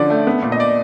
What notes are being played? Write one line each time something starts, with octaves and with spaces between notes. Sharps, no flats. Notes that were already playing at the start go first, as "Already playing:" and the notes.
Already playing: D3 F3 C#4 D5
A3
B3
A#2
D#5
D5